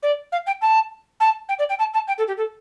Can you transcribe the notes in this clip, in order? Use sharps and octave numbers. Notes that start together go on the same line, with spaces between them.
D5
F5
G5
A5
A5
G5
D5
G5
A5
A5
G5
A4
G4
A4